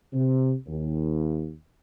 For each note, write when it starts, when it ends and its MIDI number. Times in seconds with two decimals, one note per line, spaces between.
0.13 0.52 48
0.67 1.51 39